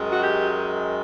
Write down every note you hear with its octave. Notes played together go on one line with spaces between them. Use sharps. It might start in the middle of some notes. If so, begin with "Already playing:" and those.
Already playing: F#2 D#3 G#3
F#4
G4